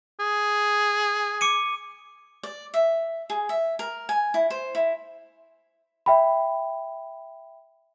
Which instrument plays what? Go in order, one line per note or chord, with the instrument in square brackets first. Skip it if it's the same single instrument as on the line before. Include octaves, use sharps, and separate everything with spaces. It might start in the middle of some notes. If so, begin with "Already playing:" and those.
[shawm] G#4
[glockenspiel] D6 C#7 D#7
[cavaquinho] D5
E5
G#4
E5
A#4
G#5
E4
C5
E4
[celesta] E5 G5 B5